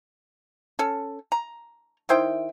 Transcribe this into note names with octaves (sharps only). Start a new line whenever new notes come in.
C#4 A4
A#5
D#3 E4 C5 G5